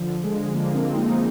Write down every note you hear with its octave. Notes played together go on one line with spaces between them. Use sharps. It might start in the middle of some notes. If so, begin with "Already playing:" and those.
Already playing: D3 F3
G#3
D3 F3 A#3
C4
D#4